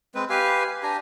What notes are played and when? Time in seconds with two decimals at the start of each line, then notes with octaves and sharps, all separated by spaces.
0.15 G#3 C4 B4
0.30 G4 B4 F5 G#5
0.83 D4 G4 G#5 A#5